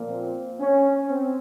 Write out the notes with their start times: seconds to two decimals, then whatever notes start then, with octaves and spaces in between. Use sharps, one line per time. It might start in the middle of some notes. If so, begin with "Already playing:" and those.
Already playing: A#2 F3 A#3
0.09 C4
0.60 C#4
1.10 C4